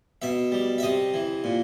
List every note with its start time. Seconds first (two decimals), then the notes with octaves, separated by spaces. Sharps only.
0.22 B2 E5
0.52 G3
0.78 E5
0.83 C3 D#5
1.14 E3
1.44 A#2